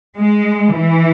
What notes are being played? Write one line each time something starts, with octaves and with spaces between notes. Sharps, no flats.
G#3
E3